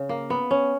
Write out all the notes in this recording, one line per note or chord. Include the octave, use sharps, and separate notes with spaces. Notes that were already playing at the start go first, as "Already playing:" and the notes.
Already playing: C#3
A#3
B3
C#4